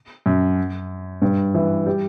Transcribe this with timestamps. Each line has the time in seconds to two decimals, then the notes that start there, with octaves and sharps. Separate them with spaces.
0.26 F#2
1.22 G2
1.54 E3
1.86 G3